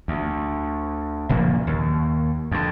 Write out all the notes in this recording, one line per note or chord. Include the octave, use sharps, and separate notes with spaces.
D2
F#1 A#2 F3 A#3
D#2
F2 D3